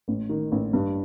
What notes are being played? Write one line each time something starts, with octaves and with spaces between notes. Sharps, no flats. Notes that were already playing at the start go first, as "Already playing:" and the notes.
A1
D#3
A1
G2